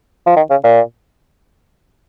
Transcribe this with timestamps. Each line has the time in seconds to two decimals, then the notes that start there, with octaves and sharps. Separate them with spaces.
0.26 F3
0.36 D#3
0.50 C#3
0.64 A#2